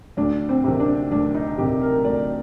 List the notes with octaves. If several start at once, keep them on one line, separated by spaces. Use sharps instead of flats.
D2 D4
C4
C3 D#3
D4
D2 D4
D#4
C3 D#3 G4
A#4
D2 D5